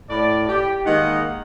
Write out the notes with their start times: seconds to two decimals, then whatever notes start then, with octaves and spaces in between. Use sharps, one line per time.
0.10 A2 D5
0.49 G4
0.86 D#3 G#3 A#3 D#4 D#5 F#5